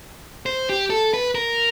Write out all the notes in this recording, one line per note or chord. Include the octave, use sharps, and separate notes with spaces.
C5
G4
A4
B4
A#4